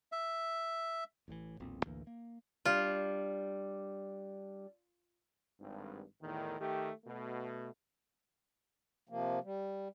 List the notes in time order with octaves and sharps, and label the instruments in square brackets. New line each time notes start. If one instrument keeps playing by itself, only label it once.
[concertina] E5
[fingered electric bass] A1 A2 C3 E3
E1 B1 A#2 C4
A1 D2 E3 A#3
A#3
[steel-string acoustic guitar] G3 D4 [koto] F4
[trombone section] G#1 G2
E2 A2 D#3
D#3 A3 G4
B2 A3
[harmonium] C3 F3 A#3
G3